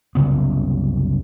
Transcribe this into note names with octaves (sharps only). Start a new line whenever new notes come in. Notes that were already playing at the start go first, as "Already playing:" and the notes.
F#1 C2 C#3 B3